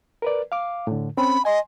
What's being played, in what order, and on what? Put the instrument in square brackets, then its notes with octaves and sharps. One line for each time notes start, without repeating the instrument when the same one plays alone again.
[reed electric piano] A#4 B4 D5
F5 D6
A2 D3
[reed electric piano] C4 C#4 [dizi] B5
[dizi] D#5 [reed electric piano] G#5 C6